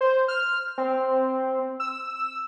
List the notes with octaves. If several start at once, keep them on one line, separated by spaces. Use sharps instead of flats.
C5
F6
C4
E6